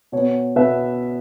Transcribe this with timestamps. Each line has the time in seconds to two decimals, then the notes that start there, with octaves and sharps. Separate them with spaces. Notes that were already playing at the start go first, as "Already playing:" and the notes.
0.12 B2 B3 C#5
0.56 B2 B3 B4 E5